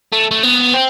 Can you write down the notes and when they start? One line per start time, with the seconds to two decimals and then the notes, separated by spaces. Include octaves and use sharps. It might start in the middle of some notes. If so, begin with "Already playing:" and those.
0.12 A3
0.31 A3
0.43 B3
0.74 C4